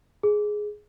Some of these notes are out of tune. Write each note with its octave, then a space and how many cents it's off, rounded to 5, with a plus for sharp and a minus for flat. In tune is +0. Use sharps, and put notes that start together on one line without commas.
G#4 +5